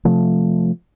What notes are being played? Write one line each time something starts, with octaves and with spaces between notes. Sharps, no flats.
C3 F3 A3